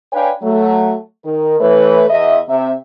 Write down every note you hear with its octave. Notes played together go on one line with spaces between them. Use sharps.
D4 B4 C#5 F5 G5 G#5
F#3 A3
D#3 A#4
E3 A3 B4 C#5
E2 D#5 E5
C3 E5